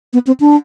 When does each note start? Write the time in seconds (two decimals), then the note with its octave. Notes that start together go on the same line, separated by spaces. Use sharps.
0.13 B3
0.27 C4
0.40 D4